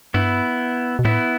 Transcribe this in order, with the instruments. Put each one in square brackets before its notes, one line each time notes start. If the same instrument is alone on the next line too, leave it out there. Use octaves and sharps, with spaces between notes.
[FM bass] G2 [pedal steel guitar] B3 E4
[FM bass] B2
[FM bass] A2 [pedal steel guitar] B3 E4